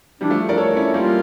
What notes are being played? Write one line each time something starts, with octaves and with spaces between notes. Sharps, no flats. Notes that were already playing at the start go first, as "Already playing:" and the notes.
E3 G3 D4
F3 A3
A#4 D5
A4 C#5
C#4 E4
G3 A#3 F4